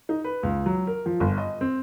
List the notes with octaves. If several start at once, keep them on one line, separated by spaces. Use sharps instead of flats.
D#4
B4
C#2
F#3
A#4
F3
G1
D#5
C4